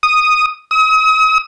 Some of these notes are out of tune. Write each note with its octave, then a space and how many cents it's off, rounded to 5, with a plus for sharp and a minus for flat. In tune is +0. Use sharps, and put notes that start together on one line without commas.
D#6 -5
D#6 +40